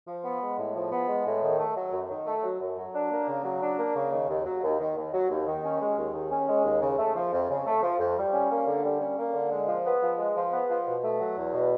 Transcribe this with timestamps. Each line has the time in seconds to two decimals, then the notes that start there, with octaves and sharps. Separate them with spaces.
0.08 F3
0.24 B3
0.41 G#3
0.59 A2
0.75 F3
0.92 B3
1.08 G#3
1.26 A2
1.43 D#3
1.59 A3
1.76 F#3
1.92 F#2
2.10 D#3
2.26 A3
2.43 F#3
2.61 F#2
2.77 F#3
2.95 D4
3.11 A#3
3.28 C#3
3.44 F#3
3.62 D4
3.78 A#3
3.96 C#3
4.12 D#3
4.29 D#2
4.46 F#3
4.63 D#2
4.80 D#3
4.97 D#2
5.13 F#3
5.30 D#2
5.47 D#3
5.64 C#4
5.80 G#3
5.98 D#2
6.14 D#3
6.31 C#4
6.48 G#3
6.64 D#2
6.82 C#3
6.98 A3
7.15 F3
7.33 F2
7.50 C#3
7.67 A3
7.83 F3
7.99 F2
8.17 G3
8.33 C#4
8.51 A#3
8.67 D3
8.84 G3
9.01 C#4
9.18 A#3
9.34 D3
9.51 G#3
9.68 F3
9.86 B3
10.03 F3
10.18 G#3
10.36 F3
10.52 B3
10.70 F3
10.87 B2
11.03 A3
11.20 F#3
11.38 E2
11.53 B2